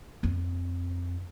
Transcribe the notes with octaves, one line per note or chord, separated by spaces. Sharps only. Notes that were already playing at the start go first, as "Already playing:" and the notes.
F2 C4